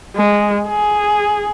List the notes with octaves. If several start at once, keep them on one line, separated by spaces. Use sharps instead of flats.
G#3
G#4